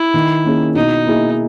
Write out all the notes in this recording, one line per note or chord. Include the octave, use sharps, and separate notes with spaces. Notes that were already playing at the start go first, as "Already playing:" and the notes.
Already playing: E4
D#3
A#3 C#4 G#4
B2 D#4
A#3 E4 G#4